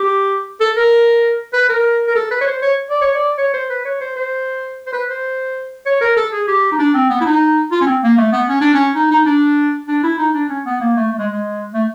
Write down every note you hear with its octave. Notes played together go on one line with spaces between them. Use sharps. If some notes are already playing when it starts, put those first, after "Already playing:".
Already playing: G4
A4
A#4
B4
A#4
A#4
A4
B4
C#5
C5
C#5
D5
C#5
D5
C#5
C5
B4
C#5
C5
C5
C5
B4
C5
C#5
A#4
A4
G#4
G4
D#4
D4
C4
B3
E4
D#4
F4
C#4
C4
A#3
A3
B3
C#4
D4
C#4
D#4
D#4
D4
D4
E4
D#4
D4
C#4
B3
A#3
A3
A3
G#3
G#3
A3